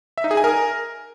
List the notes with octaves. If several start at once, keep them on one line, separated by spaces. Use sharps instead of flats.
E5
D#4
G#4
G#5
A#4